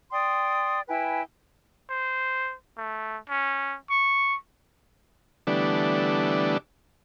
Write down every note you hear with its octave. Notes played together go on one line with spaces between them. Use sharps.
D5 G5 C6 D#6
E4 B4 G5 G#5
C5
A3
C#4
C#6
D3 E3 G3 A3 B3 D4